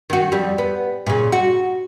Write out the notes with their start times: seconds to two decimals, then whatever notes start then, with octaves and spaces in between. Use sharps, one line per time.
0.10 D#3 F#4
0.32 F2 G3
0.58 B3
1.07 A#2 C#3
1.32 F#4